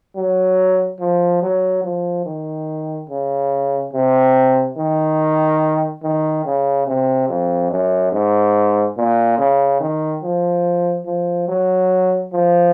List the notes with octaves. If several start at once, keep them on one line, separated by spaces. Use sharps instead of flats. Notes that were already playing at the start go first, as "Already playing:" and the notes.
F#3
F3
F#3
F3
D#3
C#3
C3
D#3
D#3
C#3
C3
F2
F#2
G#2
A#2
C#3
D#3
F3
F3
F#3
F3